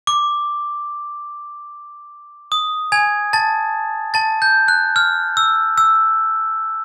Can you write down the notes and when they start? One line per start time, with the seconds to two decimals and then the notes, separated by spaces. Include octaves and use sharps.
0.07 D6
2.52 D#6
2.92 G#5 G#6
3.33 A5 A6
4.14 A5 A6
4.42 G6
4.68 F#6
4.96 F6
5.37 E6
5.78 E6